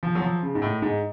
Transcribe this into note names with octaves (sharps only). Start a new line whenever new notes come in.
F3
F#3
F3
C#3
G#2
A2
G#2